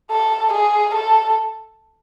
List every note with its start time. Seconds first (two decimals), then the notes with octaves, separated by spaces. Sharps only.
0.11 A4
0.53 G#4
0.95 A4